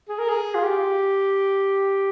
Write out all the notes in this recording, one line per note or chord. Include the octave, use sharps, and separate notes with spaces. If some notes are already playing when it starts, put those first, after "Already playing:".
G#4
A#4
G#4
F4
G4